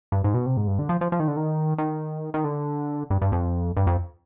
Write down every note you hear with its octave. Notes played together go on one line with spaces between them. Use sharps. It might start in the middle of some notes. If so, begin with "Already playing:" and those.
G2
G#2
B2
C3
G#2
G2
D3
F3
F3
F3
D#3
D3
D#3
D#3
D#3
D3
G2
G2
F2
G2
F2